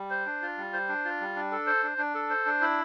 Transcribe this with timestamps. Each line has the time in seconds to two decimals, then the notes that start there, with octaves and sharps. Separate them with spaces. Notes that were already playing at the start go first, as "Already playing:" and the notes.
Already playing: G3
0.10 C5
0.26 D4
0.42 F4
0.58 G3
0.73 C5
0.89 D4
1.05 F4
1.20 G3
1.36 D4
1.52 A4
1.67 C5
1.83 D4
1.98 D4
2.15 A4
2.30 C5
2.46 D4
2.61 E4